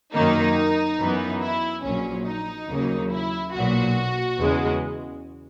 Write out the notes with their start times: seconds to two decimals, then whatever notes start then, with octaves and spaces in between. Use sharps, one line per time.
0.14 F#2 D#3 A#3 D#4
1.00 F#2 E3 B3
1.41 E4
1.83 A#1 A#2 F#3 C#4
2.26 D#4
2.69 D#2 C#3 F#3 A#3
3.11 E4
3.55 B1 A#2 F#3 F#4
4.39 E2 C#3 G#3